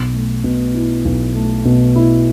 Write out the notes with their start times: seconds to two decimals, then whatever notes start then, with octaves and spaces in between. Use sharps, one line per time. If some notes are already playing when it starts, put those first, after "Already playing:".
Already playing: B1
0.13 A3
0.44 B2
0.75 E4
1.05 B1
1.35 A3
1.65 B2
1.96 E4